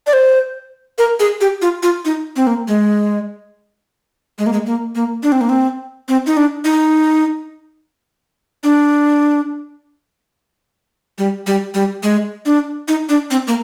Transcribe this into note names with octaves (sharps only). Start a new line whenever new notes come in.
D5
C5
A#4
G#4
G4
F4
F4
D#4
C4
A#3
G#3
G#3
A#3
G#3
A#3
A#3
D4
C4
A#3
C4
C4
D#4
D4
D#4
D4
G3
G3
G3
G#3
D4
D#4
D4
C4
A#3